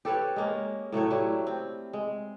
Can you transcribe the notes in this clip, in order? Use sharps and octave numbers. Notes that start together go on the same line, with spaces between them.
G4 A4 B4 C#5
G#3 A#3 C#4
A2 F#3 A3 C#5
F#3 G3 E4
C4
G#3